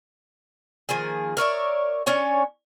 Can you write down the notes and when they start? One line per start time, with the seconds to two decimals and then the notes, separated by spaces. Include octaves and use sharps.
0.89 D#3 F3 A#3 G#4
1.37 A#4 C#5 D5 E5
2.06 C#4 D4 C#5 G#5